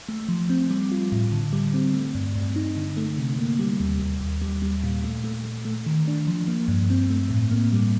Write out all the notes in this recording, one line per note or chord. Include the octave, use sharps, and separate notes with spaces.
A3
F3
C4
G3
F4
A2
D3
G3
C4
A3
G2
G2
D#4
D3
A3
C3
A#3
G3
D#2
D#2
D#2
G3
G3
A#2
A3
A3
A3
A3
D#3
D4
F3
A#3
G2
C4
A3
A2
A#3
G3